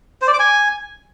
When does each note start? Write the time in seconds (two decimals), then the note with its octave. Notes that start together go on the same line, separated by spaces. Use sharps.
0.22 C5
0.28 D5
0.33 D6
0.39 G#5